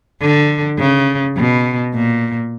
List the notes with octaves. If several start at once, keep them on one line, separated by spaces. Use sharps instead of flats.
D3
C#3
B2
A#2